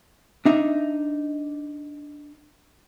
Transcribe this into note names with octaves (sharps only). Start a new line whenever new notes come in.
D4 D#4 E5